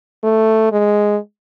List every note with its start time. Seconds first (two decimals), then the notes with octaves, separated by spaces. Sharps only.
0.24 A3
0.72 G#3